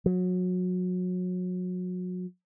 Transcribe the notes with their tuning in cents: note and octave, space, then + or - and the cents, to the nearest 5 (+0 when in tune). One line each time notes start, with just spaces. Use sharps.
F#3 -30